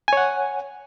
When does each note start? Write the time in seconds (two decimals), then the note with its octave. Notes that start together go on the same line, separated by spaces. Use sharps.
0.08 G#5
0.13 C#5
0.17 F#5